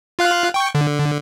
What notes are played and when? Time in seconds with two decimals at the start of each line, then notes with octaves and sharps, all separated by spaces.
0.19 F4 F5 F#6
0.54 G5 C#6
0.75 D3